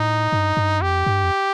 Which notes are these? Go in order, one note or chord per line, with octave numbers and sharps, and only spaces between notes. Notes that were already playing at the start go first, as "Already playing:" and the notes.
Already playing: A2 D#4
G2
G2
F2 G4
G2
F2